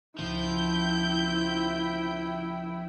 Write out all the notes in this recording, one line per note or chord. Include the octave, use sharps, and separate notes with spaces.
C#2 F3 E4 G5 G6